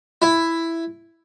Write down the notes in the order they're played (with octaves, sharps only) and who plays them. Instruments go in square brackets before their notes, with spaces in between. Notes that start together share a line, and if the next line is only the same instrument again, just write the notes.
[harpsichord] E4